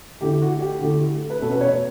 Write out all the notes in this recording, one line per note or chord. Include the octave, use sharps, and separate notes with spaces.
D3 A3 E4 G4
F#4
G4
D3 A3 E4
B4
B2 A3 C#4 A4
B4
C#5